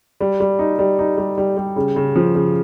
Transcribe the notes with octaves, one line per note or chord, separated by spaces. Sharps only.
G3
G3
D#4
G3
D#4
G3
G3
G3
C#3
C#3
F3
C#3